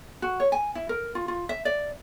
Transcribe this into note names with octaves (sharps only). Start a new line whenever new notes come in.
F#4
C#5
G#5
E4
A#4
F4
F4
E5
D5